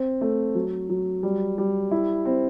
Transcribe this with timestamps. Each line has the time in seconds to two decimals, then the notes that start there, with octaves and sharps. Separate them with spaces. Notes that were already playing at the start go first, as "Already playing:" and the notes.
Already playing: C4
0.21 A3
0.55 F#3
0.89 F#3
1.23 G3
1.58 G3
1.91 E4
2.25 C4